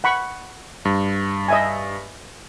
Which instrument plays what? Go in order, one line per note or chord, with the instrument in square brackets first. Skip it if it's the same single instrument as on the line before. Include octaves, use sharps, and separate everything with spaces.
[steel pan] F#5 B5 C#6
[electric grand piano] G2
[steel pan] D#5 E5 G#5